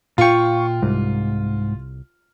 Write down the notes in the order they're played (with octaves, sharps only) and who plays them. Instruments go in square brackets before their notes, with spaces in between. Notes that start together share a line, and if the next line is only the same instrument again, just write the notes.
[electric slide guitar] A#2 G5 [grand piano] F4 [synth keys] F5 C#6
[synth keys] C2 [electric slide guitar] G#2